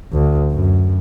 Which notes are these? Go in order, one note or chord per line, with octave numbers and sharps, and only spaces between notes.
D2
F#2